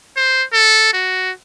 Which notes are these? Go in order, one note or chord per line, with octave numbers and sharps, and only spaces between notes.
C5
A4
F#4